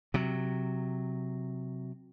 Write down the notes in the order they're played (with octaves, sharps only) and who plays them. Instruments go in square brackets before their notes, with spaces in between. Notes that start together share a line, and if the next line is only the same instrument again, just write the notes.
[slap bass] C3 F#3